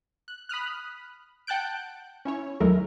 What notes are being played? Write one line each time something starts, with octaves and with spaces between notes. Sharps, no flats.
F#6
B5 D#6 F6 F#6
F#5 G5 A5 F#6 G6 D7
C#4 E4 C#5
D#2 F#3 G#3 A3 E4 A#4